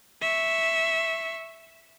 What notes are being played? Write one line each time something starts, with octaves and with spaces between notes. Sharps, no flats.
E5 C#6